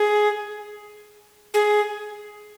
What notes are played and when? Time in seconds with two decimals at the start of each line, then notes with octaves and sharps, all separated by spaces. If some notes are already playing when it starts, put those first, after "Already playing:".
Already playing: G#4
1.54 G#4